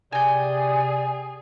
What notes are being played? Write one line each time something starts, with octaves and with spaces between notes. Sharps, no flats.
C3 G#4 D5 G5 G#5